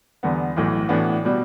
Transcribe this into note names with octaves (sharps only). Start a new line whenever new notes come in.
E2 D3 G3 B3
B1 A2 E3
A2 E3 B3 D4 F#4
B2 G3